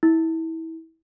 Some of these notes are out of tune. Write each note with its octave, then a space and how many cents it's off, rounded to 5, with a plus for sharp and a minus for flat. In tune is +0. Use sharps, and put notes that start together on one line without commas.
E4 -25